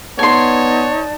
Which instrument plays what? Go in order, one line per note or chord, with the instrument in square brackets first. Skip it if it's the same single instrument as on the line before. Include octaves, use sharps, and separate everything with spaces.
[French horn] B3 [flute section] D#4 D5 A5 [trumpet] C#5 [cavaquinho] G#5 C6